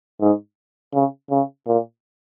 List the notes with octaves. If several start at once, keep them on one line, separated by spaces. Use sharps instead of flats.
G#2
C#3
C#3
A#2